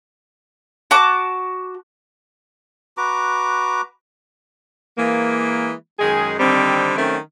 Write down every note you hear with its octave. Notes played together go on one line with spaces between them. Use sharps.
F#4 A5 D6
F#4 B4 A#5 D6
E3 G#3 A#3
F#2 D#3 G#3 G#4
D3 D#3 G3 C4
D#3 F#3 A3 C4 C#4